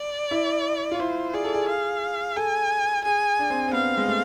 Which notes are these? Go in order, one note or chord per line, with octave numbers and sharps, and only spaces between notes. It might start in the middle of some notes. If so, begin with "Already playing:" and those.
Already playing: D5
E4
F4
E4 C5
G#4 D5
A4
G#4
F5
A4 G#5
G#4 G#5
D4
C4
C4
B3 F5
G#3
A3